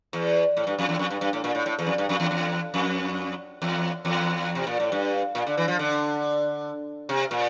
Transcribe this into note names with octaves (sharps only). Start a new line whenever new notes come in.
E2
A2
G2
F2
E2
F2
G2
G2
A2
A#2
A2
A2
E2
F2
G2
F2
E2
E2
F2
E2
E2
C3
A#2
A2
G2
A#2
D3
E3
F3
D3
C3
A#2